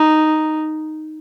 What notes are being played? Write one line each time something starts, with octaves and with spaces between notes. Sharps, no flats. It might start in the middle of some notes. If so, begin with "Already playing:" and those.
Already playing: D#4